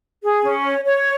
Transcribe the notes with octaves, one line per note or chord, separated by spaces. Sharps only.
G#4
C#4
C#5
C#5